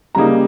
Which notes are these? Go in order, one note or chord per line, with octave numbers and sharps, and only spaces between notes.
C#3 G3 A#3 D#4 A#5